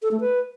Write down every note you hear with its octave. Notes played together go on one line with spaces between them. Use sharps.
A4
A3
B4